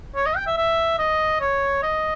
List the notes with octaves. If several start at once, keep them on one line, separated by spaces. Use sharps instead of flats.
C#5
D#5
G5
E5
E5
D#5
C#5
D#5